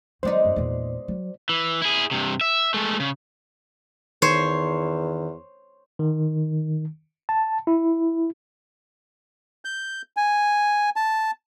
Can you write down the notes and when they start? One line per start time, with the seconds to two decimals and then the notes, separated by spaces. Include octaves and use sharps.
0.23 D#3 F#3 G#3 B3 D#4 C5 D5
0.45 F#2
0.56 E2 A#2
1.08 F#3
1.49 E3
1.82 E4 G#4
2.11 G2 C3
2.41 E5
2.74 G#3 A3
3.00 C#3
4.22 E2 D#3 C5 C#5
5.99 D#3
7.29 A5
7.67 E4
9.65 G6
10.17 G#5
10.96 A5